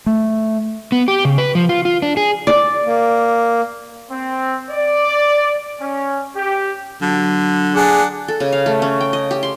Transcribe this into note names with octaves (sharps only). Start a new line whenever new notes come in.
A3
B3
G4
C#3
B4
F3
F4
F4
D4
G#4
D5
A#3
C4
D5
C#4
G4
D3 F#3
D4 G#4 F#5
A4
C#3
F5
A3
C#4
G5
D#5
G4
C6